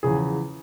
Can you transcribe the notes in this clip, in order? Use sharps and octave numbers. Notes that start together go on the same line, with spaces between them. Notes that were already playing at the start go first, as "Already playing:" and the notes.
E2 C#3 F3 G#4